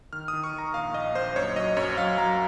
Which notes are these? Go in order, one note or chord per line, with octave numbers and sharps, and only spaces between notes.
D#3 F6
D#6
D#3
C#6
D#3 A#5
A#1 F5
A#1 D#5
A#1 C5
F#2 C#5
F#3 D#5
F#2 C#5
F#3 F5
F#3 A#5